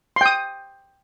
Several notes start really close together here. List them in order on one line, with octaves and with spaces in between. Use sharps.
C6 G5 D#6